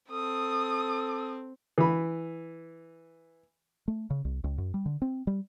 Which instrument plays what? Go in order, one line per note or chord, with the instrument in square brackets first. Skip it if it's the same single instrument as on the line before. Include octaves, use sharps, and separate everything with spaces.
[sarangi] C4 [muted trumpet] A4 [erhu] D#6
[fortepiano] E3 B5
[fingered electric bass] A3
C#3
C2
C#2
F#2
G3
D3
C4
G3